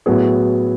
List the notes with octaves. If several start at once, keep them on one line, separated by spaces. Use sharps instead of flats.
A2 F#3 B3 E4 G#4